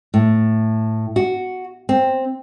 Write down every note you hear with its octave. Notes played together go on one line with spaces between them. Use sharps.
A2
F#4
C4